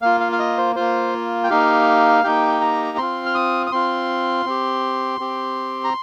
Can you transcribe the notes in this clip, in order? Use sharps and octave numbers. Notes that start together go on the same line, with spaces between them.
A#3 F4 F5
F5
F5
D#5
C5
A#3 F4 C5
G5
A#3 D#4 G4 F5
A#3 D#4 G4 G5
A#5
C4 F4 C6
F6
D#6
D#6
C4 F4 C6
C4 G4
C4 G4
A#5